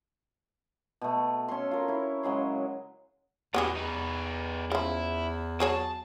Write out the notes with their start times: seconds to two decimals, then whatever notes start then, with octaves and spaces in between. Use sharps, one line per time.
1.02 B2 A3
1.48 C#4 A4 C6
1.71 F4 A#4
1.88 E4 C#5
2.23 C#3 F#3 G#3 C6
3.54 E2 A2 F#3 B3 G4 G#4
3.76 E2 D#4 B4
4.72 C#3 F3 E4
5.60 F#3 G#4 C#5 A5